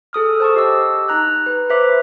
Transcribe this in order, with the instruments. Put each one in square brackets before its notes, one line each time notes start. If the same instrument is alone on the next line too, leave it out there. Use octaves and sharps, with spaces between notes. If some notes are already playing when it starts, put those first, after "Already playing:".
[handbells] G#4 A4 D#6 F6
C5 A5 C#6
G4 D#5 E6
D#4 A#5 F#6
B4
B4 C5 E5 D6